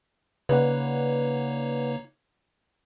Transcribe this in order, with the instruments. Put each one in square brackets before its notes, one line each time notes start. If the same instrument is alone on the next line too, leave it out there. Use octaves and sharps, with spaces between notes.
[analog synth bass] C#3 [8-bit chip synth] A#3 D#4 C#5 [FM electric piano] B4 D5 F#5